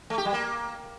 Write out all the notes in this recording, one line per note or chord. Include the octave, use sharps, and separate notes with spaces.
A3
G4
G3
A#3